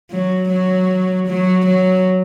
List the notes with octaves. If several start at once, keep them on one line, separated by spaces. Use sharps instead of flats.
F#3
F#3
F#3
F#3